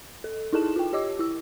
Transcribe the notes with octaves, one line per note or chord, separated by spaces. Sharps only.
A4
D#4 E4 G#4 A4 A5 E7
F4 G5
G4 C#5 D#5 D6 E6
E4 E6